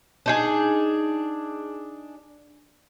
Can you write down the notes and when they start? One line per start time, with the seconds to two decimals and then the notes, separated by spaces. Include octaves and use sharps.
0.26 D4 D#4 G#4